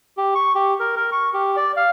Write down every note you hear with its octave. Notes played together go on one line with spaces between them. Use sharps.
G4
C#6
G4
A#4
A#4
C#6
G4
D5
F5